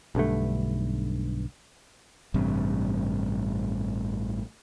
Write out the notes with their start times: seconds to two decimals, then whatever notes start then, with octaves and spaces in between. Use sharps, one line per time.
0.15 B1 G2 D3 A3
2.34 A1 G2 C3